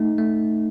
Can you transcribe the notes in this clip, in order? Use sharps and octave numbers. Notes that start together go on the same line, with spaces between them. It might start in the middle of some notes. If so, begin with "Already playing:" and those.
Already playing: A3 D#4
A3